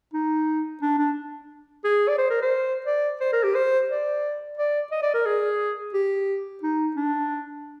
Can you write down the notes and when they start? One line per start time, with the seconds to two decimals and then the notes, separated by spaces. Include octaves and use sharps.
0.14 D#4
0.82 D4
0.98 D4
1.84 G#4
2.08 D5
2.18 C5
2.30 A#4
2.41 C5
2.86 D5
3.21 C5
3.33 A#4
3.44 G4
3.55 C5
3.90 D5
4.57 D5
4.91 D#5
5.02 D5
5.14 A#4
5.26 G#4
5.94 G4
6.63 D#4
6.96 D4